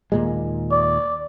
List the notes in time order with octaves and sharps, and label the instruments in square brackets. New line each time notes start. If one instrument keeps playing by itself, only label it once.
[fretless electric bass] D#2 A#2 G#3
[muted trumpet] D5